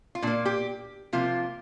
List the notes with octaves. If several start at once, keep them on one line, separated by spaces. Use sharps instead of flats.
F4
A#2 A#3 D4
G4
C3 F3 A#3 F4